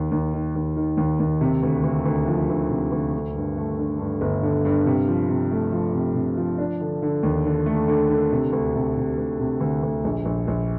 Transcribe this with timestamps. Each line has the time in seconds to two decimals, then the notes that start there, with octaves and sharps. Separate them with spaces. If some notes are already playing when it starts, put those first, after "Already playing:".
Already playing: D#2 D#3
0.11 D#2
0.34 D#3
0.55 D#2
0.76 D#3
0.97 D#2
1.20 D#2
1.41 C3
1.62 D2
1.84 D2
2.05 D2
2.27 F3
2.49 D2
2.70 C3
2.92 D2
3.13 D3
3.36 G2
3.57 A3
3.79 D3
3.99 G2
4.21 G1
4.43 D3
4.65 G2
4.86 C3
5.08 F3
5.29 C3
5.51 A3
5.72 F3
5.94 C3
6.15 C3
6.37 F3
6.58 D4
6.80 D3
7.02 D3
7.23 D#2
7.45 D3
7.66 A3
7.88 D3
8.10 D3
8.32 C3
8.52 D2
8.75 C3
8.97 C3
9.18 D2
9.40 C3
9.60 D2
9.83 D2
10.04 A#1
10.25 A#1
10.48 A#1